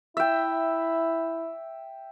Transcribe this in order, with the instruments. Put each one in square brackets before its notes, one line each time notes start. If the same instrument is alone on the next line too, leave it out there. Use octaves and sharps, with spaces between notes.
[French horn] E4 [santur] E5 G5